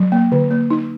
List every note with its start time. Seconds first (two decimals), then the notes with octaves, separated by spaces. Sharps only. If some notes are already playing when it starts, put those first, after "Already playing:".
Already playing: F#3
0.12 A#3
0.32 D3
0.51 A#3
0.70 D#4